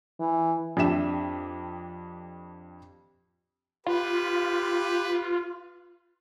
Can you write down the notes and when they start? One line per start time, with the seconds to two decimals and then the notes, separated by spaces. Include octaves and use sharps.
0.20 E3
0.77 F2 D4 G4 E5 E7
3.86 F4 G4 B4